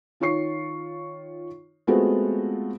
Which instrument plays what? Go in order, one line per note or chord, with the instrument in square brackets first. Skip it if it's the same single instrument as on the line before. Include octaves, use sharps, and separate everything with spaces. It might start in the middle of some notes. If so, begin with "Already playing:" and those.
[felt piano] D#3 F4 C#5 C#6 C7
G#3 A3 B3 C4 F4 F#4